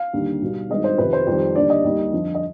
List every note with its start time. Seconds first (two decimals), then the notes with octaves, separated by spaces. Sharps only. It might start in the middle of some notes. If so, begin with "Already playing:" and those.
Already playing: F5
0.13 D#2 D3 G3
0.42 B1 B2 G3
0.70 G#1 G2 D#3 G#3 D#5
0.84 C5
0.98 F2 C3 D#3 B4
1.13 C5
1.27 F2 D#3 G3
1.56 D#2 D3 G3 D5
1.70 D#5
1.84 D#2 D#3 G3
2.13 F2 D3 F3
2.35 D#5